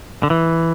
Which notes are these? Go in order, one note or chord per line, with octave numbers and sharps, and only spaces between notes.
D3
E3